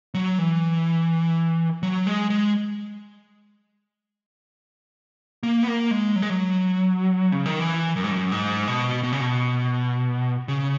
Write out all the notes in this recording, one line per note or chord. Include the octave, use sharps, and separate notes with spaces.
F#3
E3
F#3
G#3
G#3
A#3
B3
A#3
G#3
F#3
G#3
F#3
C#3
D#3
E3
F#2
G#2
F#2
G#2
B2
B2
C#3
B2
C#3